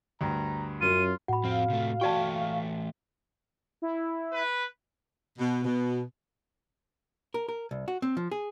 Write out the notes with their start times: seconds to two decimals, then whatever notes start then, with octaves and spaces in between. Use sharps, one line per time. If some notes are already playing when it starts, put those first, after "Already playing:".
0.21 D2 G2 A#5
0.81 F#2 F4 D#7
1.28 A2 F#4 F#5 B5
1.44 F2 C4 F5
1.70 C3 A3
2.01 E3 A3 F#4 D5 G5 A5 C#6
3.82 E4
4.33 B4
5.39 B2
5.65 B2
7.34 A#4
7.49 A#4
7.71 C2
7.88 F#4
8.02 C4
8.17 F3
8.31 G#4